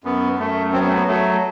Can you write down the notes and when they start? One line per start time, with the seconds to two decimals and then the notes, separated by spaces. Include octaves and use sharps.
0.04 F#2 B3
0.39 F#2 A3
0.73 F#3 C4
0.80 B3
0.87 A3
0.94 B3
1.07 F#3 A3